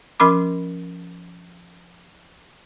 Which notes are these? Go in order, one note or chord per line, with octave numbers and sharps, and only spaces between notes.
F3 C#4 A#4 B5 D6